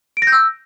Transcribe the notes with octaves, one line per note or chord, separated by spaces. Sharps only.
D7
A#6
G6
E6